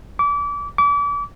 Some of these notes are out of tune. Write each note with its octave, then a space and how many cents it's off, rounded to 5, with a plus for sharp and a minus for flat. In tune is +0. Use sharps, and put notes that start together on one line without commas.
D6 -30
D6 -35